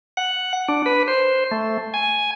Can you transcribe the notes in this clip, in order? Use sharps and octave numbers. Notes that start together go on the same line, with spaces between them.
F#5
D4
B4
C5
A3
G#5